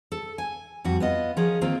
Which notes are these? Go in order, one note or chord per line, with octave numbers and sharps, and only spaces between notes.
A4
G#5
F2 G3 F#4
B3 F4 D#5
F3 C#4 G#4 A#4
D#3 A#3 C4 F4